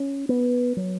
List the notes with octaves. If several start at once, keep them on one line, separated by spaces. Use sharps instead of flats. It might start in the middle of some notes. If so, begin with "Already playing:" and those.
Already playing: C#4
B3
F#3